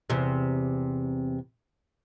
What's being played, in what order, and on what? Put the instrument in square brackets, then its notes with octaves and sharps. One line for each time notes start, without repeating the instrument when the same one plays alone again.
[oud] E2 C3